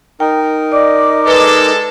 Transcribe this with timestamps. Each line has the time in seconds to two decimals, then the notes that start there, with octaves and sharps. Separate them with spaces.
0.20 D#4 A#4 G5
0.72 D5 D#5 D6
1.26 G#3 A4 B4